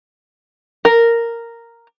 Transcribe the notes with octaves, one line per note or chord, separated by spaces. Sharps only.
A#4